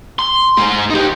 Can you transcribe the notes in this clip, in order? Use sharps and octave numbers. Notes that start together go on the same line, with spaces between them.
C6
G#3 C5
D#4 G4